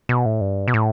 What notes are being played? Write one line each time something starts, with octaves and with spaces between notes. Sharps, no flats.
B2
A2
G2
B2
A2